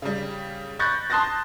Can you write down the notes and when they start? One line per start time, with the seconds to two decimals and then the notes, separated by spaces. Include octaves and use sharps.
0.02 C#3 G3
0.79 B5 C#6 F#6 G6 A6 A#6
1.10 A5 C6 D#6 F#6 A6 A#6